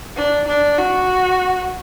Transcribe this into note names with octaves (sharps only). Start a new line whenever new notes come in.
D4
D4
F#4